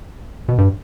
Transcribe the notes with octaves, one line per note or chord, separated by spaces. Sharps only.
B2
G2